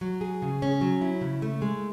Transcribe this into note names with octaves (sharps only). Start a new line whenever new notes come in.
F#3
G#4
C#3
C#4
F#3
E4
C#3
A3
G#3